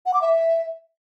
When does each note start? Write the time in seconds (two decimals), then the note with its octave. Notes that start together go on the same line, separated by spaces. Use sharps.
0.06 F#5
0.14 D6
0.22 E5